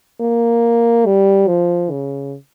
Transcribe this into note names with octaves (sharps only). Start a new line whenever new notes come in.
A#3
G3
F3
C#3